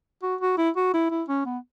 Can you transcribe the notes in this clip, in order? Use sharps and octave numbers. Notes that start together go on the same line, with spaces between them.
F#4
F#4
E4
F#4
E4
E4
C#4
B3